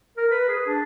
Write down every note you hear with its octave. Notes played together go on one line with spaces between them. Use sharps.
A#4
B4
G#4
D4